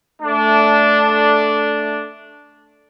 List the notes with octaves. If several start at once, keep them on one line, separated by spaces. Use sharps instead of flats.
A3 D4